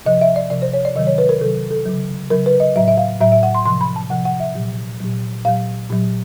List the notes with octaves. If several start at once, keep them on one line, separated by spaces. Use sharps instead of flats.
C3 F3 D#5
E5
D5
C3 F3 D5
C5
C#5
D5
C3 D#3 F#3 D#5
C#5
B4
A#4
C3 D#3 F#3 A4
A4
C#3 F#3
C#3 F#3 A#4
B4
D#5
A2 F#3 E5
E5
F5
A2 F#3 E5
E5
F#5
C6
C3 F3 C6
B5
A5
C3 F3 F#5
F#5
E5
A#2 F#3
A#2 F#3
A#2 F#3 F5
A#2 F#3